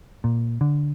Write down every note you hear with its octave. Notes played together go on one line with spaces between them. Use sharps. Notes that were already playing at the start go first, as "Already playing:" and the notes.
A#2
D3